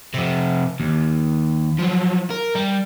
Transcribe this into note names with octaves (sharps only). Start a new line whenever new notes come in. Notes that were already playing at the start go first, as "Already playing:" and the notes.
C3 F3
D#2
F3 F#3
A#4
G3